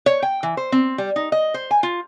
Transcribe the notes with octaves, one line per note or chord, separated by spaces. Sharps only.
C#5
G5
E3
C5
C4
G3
D#4
D#5
C5
G#5
F4